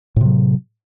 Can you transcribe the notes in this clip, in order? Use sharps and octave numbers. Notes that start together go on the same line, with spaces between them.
A2 C3 F#3